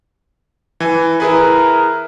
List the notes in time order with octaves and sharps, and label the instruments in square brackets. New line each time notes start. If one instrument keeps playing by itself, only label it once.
[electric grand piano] E3 G#5
[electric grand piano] E4 G#4 B4 [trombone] A#4